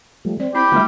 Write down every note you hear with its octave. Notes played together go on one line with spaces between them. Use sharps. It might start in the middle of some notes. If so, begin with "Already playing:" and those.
F3 G3 A3
C4 D5
E4 G4 B5
D3 G3 A3 B3 F4